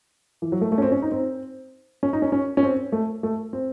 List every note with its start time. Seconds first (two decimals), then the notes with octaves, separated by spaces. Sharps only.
0.42 E3
0.52 F#3
0.61 A3
0.72 A3
0.78 C#4
0.82 C4
0.92 C#4
1.02 D#4
1.12 C4
2.03 C#4
2.13 D#4
2.22 C#4
2.32 C#4
2.57 C#4
2.63 C4
2.92 A3
3.23 A3
3.53 C4